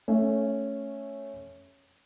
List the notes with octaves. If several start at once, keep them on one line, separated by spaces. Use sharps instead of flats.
A3 C#4